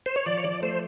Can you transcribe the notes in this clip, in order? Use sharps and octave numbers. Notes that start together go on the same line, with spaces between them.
C5
C#5
F3 D5
C#5
F3 D5
A3 C5